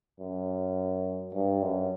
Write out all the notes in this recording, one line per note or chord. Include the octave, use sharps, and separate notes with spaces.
F#2
G2
F#2